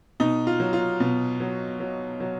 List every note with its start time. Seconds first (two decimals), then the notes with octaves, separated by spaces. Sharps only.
0.20 B2 D#4
0.47 F4
0.60 F#3
0.73 F4
1.00 B2
1.40 F#3
1.80 F#3
2.20 F#3